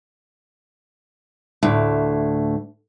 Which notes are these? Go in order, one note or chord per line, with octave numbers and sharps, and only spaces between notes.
D2 A2